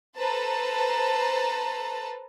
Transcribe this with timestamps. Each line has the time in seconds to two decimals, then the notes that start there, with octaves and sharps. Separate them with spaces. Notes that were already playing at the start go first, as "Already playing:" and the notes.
0.17 A4 B4 C5 A5 A#5